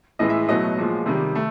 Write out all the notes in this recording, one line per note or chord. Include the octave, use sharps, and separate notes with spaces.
A2 E3 G#3 D#5
E5
B2 F#3 A3 D#5
A#2 F3 G#3
C3 D#3 G3
A3